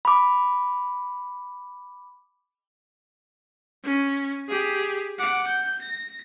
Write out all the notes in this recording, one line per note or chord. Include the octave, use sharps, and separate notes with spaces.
B5 D6
C#4
G4 G#4
F#5 D6
G6
A#6